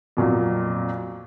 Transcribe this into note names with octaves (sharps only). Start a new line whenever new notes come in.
F2 A#2 F#3